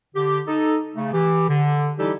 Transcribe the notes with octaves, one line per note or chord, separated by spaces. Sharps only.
D3 G4
D#4 A4
C#3 A3
E3 G4
D3
E3 G3 D#4 E4 G4 A4